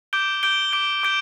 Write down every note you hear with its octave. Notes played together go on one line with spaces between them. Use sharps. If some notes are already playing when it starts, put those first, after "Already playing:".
D6 G6 D7 G7
D6 G6 D7 G7
D6 G6 D7 G7
D6 G6 D7 G7